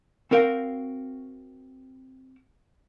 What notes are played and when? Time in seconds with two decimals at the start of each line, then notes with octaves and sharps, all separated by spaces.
0.31 C4 F#4 A#4 F5 G5